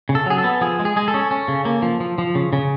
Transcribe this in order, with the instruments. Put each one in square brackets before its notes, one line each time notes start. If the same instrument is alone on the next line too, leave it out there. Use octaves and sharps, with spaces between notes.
[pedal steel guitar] C#3
A4
F#3 G#4
A4
B3
F3 G#4
G#3
G#4
G#3 G#4
A4
C#4
C#4
C#3
A#3
F3
F3
F3
C#3
C#3